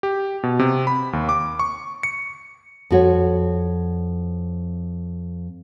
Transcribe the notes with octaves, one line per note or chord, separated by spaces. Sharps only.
G4
B2
C3
B5
D#2
D6
C#6
C#7
F2 F#4 C#5